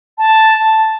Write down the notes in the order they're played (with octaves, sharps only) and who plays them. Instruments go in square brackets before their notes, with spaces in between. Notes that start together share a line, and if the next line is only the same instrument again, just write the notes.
[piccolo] A5